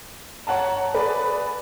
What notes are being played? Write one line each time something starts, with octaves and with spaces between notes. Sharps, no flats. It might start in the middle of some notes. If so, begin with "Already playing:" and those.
C#5 F#5 A5 A#5
G#4 B4 D5